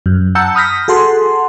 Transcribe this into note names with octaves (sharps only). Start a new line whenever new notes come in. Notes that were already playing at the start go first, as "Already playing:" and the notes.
F#2
F#5 A5 A#5 E6 G6 C#7
B5 D#6 F6 G6 A#6 B6
F#4 G#4 A4 F#5 C6